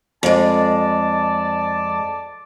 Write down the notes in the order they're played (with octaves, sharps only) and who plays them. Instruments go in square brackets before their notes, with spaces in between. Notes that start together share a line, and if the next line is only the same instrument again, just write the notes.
[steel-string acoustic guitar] F2 G#3 [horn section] D5 A5